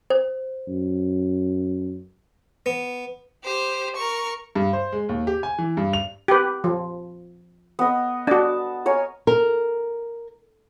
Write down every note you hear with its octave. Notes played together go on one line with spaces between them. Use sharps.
C5
F#2
B3
G4 C5
A#4 C#6
G2
C5
G#3
D#2
G4
G#5
E3
G2
F7
G4 B4
F3
B3 D#5
D4 F#4 A5
A#4 C#5 G#5
A#4